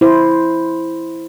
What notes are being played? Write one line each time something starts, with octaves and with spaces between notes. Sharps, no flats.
E4 C5